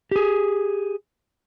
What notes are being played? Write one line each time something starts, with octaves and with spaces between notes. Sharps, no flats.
G4 G#4